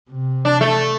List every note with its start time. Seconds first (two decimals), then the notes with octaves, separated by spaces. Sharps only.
0.10 C3
0.45 D4
0.61 A3